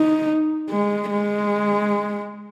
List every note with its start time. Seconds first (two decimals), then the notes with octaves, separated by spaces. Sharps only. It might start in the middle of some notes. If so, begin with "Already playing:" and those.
Already playing: D#4
0.70 G#3
1.10 G#3